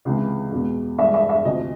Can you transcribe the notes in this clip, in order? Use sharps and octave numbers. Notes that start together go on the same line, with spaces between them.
C#2 C3 E3 G#3
E2 B2 G#3
G2 E3 G#3 E5
E5
E5
D2 C3 F3 D#5